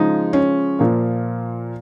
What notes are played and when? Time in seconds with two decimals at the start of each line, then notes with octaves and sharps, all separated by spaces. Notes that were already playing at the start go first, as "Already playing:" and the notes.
Already playing: C#3 F3 G#3 D#4
0.33 C#4
0.79 A#2 F3 A#3